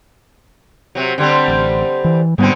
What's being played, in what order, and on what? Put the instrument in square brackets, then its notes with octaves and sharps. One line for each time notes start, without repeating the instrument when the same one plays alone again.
[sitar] C3 F#3
D3 G3 C4
[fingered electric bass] A1
E3
[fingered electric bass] G#2 G3 B3 [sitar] B2 D3 C4